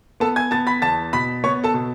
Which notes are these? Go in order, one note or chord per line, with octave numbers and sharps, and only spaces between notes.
B3 A4 A5
G#5 G#6
B3 A5 A6
B5 B6
E2 A5 A6
B2 B5 B6
B3 C#5 C#6
A4 A5
B2